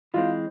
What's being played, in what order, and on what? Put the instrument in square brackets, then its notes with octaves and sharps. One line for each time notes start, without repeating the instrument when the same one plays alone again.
[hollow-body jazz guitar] E3 G#3 C4 [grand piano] F4